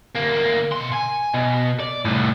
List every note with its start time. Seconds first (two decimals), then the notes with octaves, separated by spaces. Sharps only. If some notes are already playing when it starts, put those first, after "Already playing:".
0.16 D2 A#3
0.72 B2 C6
0.93 G#5
1.34 B2
1.80 D5
2.05 C2 A2